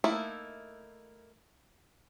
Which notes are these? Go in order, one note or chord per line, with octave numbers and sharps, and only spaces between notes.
A3 A#3 D#4 E4